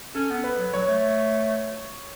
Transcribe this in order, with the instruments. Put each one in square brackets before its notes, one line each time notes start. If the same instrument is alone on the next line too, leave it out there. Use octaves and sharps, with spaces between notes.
[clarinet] C#4 [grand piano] A4
[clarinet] B3
[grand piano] B4
[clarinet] F#3
[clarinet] F#3 [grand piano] C#5
[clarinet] A3